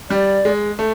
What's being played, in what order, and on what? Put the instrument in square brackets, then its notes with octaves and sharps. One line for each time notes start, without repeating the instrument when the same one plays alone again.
[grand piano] G3 [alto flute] D5
[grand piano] G#3
A3